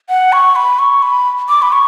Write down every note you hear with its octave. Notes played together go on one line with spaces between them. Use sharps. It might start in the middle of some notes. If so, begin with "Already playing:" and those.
F#5
C#6
B5
C#6
B5
D6
B5
C#6